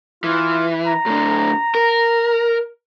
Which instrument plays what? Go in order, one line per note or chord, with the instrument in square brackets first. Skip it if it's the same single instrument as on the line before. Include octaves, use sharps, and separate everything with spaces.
[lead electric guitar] E3 [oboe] F4
[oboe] A#5
[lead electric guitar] A2 D3
A#4